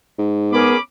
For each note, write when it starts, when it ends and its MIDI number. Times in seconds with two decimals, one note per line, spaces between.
0.19 0.73 44
0.52 0.76 59
0.52 0.78 61
0.52 0.76 68
0.52 0.76 70
0.52 0.78 83
0.52 0.78 86